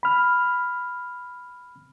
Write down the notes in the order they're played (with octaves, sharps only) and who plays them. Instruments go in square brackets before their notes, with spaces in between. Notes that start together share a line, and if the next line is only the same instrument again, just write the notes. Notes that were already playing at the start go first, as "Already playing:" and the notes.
[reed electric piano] B5 F6